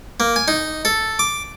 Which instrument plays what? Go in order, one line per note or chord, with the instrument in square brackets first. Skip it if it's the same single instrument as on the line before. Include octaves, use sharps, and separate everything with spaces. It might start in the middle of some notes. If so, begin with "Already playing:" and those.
[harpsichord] A#3
G#5
D#4
A4
D6